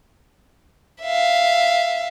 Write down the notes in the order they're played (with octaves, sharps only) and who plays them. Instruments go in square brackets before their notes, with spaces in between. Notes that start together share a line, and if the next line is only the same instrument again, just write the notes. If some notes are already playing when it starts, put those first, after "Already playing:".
[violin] E5 F5